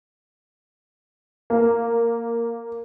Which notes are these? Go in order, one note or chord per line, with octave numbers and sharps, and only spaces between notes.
A#3